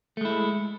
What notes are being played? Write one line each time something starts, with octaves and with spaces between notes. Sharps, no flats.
G#3 A3 E4